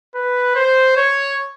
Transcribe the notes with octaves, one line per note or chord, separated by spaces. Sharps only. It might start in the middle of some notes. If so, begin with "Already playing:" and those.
B4
C5
C#5